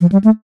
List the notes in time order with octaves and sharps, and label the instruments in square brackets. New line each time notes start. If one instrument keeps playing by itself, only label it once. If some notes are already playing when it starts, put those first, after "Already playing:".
[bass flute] F3
G3
A3